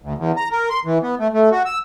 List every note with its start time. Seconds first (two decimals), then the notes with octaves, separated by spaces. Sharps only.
0.02 D2
0.18 E2
0.37 A#5
0.51 A#4
0.70 C6
0.85 E3
1.03 B3
1.19 A3
1.33 A3
1.51 F#4
1.66 E6